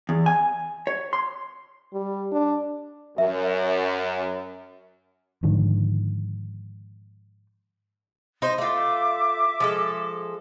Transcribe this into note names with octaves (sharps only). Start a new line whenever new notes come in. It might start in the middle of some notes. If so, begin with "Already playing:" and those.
E2
G#5
C#5
C6
G3
D4
F#2 E5
G#2 D3 D#3 F3
D#4 C5
A3 F4 E5 D6
F3 G#3 A4